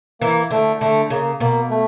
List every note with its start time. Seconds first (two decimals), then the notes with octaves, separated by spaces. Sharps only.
0.21 E3 A#3
0.51 D3 A3
0.81 D3 A3
1.10 C#3 A#3
1.40 B2 A#3
1.70 A3